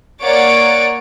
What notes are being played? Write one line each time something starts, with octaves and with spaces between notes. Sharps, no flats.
A#3 C#5 D5 F#5 A6 D7